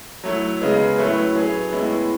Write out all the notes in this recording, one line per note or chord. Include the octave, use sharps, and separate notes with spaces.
F#3 A3 E4
C#3 G#3 B3
A2 F#3 A3 E4 B4
F#3 C#4 G#4 B4
A2 G#3 B3 E4